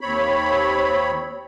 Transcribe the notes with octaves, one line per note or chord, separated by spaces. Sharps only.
D#2 C4 C#5 B5